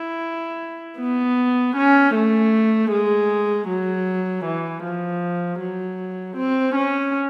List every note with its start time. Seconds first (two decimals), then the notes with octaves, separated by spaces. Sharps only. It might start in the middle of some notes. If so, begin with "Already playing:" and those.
Already playing: E4
1.00 B3
1.76 C#4
2.15 A3
2.92 G#3
3.68 F#3
4.45 E3
4.83 F3
5.60 F#3
6.37 C4
6.75 C#4